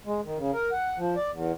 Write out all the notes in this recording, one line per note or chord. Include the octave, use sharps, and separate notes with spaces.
G#3
D#3
C#3
A#4
F#5
F3
D5
E2